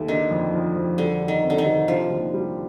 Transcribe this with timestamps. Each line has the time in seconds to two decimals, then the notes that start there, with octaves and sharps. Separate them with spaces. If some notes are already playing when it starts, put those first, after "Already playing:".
Already playing: D#2 A3
0.08 D3 D#3
0.31 F2
0.54 F3
0.75 F2
0.98 D3 G3
1.20 G4
1.28 D#3
1.43 C4
1.50 D3
1.58 D#3
1.66 C3
1.88 D3 F3
2.10 D#2
2.34 G3